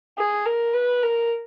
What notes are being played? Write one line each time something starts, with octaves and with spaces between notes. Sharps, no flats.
G#4
A#4
B4
A#4